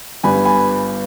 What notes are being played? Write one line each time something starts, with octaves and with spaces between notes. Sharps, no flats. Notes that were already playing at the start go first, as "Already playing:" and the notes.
G1 G2 G3 B3 G#5 B5
G#5 B5